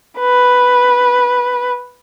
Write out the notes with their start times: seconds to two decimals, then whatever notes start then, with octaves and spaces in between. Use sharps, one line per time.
0.19 B4